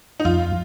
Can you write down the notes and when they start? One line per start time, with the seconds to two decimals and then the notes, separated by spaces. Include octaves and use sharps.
0.20 D#4
0.25 F2 F4